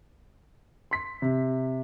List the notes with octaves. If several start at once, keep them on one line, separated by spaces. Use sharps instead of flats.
C6 B6
C3